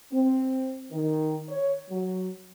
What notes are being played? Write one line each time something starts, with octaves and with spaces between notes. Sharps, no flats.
C4
D#3
C#5
F#3